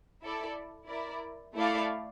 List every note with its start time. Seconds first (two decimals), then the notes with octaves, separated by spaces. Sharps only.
0.22 E4 A4 D5
0.88 E4 A#4 D5
1.56 A3 E4 A4 D5 F5